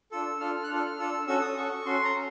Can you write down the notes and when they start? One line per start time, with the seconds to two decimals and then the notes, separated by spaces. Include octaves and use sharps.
0.12 D4 F4 A4 E6
0.40 D4 F4 A4 F6
0.63 F#6
0.69 D4 F4 A4 F6
0.99 D4 F4 A4 E6
1.27 C#4 F#4 A4 E6
1.42 D#6
1.56 C#4 F#4 A4 C#6
1.86 C#4 F#4 A4 C6
2.05 A#5
2.15 C#4